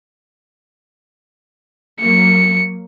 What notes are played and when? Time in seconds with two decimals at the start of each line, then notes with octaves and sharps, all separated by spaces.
2.01 F#3 A#3 C#7